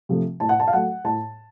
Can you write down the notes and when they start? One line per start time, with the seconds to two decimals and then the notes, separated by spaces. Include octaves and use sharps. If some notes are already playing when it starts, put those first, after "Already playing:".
0.09 C3 F3 A3
0.40 A2 A5
0.49 F#5
0.60 A5
0.68 F5
0.73 F#3 A3 F#5
1.04 A2 A5